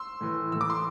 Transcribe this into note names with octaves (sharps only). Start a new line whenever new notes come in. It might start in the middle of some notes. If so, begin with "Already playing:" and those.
Already playing: C6 E6
A2 E3
A2 E3 E6
D6
C6